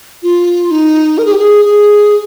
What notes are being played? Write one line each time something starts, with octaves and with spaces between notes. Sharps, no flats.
F4
D#4
A#4
G#4
G4
G#4
G#4